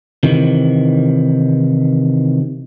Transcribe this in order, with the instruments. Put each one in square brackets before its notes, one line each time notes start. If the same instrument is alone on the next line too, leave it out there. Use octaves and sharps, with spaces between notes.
[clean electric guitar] C3 D#3 E3